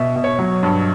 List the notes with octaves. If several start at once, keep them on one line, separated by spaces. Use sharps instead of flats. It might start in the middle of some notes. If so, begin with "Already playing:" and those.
Already playing: B2 E5
B2
C#5
F#3
G2